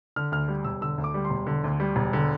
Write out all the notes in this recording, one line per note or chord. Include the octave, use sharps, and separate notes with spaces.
D3 F6
D2 F6
G3
E1 E6
D3 E6
D2
D6
G3
C6
E1
D3
D2
G3
E1
D3